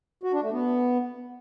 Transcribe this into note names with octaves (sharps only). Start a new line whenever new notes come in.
F#4
D4
A3
B3